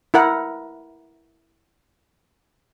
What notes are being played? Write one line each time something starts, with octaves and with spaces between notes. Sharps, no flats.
E4 A#4 F#5